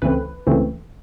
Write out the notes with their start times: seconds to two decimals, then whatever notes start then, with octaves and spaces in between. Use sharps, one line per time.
0.02 C#2 C#3 E3 A3 C4 B4
0.47 C#2 C#3 E3 A3 C4